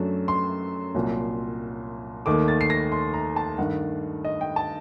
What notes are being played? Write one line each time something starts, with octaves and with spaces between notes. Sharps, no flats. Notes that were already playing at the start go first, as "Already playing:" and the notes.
Already playing: F#2 F#3 A3 D4
C6
C2 A#2 F#3
D#2 D#3 A3 D6
A6
C7
A#6
C6
A#5
A5
G2 D#3 A3 F#5
D#5
G5
A5